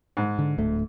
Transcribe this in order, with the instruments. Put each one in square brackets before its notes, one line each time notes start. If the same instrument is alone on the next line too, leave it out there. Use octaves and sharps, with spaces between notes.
[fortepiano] G#2
[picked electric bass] D3
D1 D2 A3